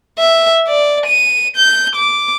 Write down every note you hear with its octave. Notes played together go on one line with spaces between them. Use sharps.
E5
D5
D#7
G6
D6